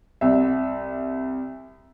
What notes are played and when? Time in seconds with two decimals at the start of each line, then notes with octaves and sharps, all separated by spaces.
0.21 C2 E5